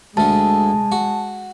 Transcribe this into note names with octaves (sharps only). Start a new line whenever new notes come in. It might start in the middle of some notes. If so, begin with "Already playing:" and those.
D2 D3 G#3 A5
F#4